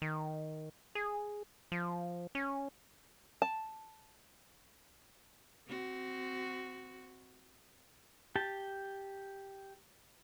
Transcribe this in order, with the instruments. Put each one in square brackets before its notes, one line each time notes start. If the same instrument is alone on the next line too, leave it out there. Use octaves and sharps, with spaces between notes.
[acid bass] D#3
G#4
F3
C#4
[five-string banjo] A5
[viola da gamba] C4 F#4
[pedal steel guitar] G4 A5